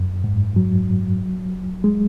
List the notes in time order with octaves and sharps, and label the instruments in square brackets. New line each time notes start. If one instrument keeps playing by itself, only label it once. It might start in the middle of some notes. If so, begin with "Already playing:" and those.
Already playing: [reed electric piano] F#2
G#2
F#3
G#3